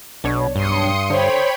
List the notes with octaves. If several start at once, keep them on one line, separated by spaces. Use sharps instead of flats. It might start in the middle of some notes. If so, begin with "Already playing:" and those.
B1 B2 D4 C#5
G2 C6 D#6 C#7
D3 C5 C#5 G5 B5